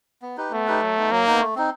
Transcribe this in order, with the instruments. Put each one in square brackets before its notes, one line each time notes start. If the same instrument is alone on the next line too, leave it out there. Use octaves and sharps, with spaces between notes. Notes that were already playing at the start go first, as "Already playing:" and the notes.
[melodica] B3
D#4 G4 B4
[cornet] A3 [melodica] B3
[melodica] D#4 G4 B4
F#3
B3 D#4
[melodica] F#3 [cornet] A#3
[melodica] B3 D#4
A3
C4 D#4